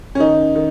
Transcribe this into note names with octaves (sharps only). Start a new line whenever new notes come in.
C#4
D#3 D#4
D#3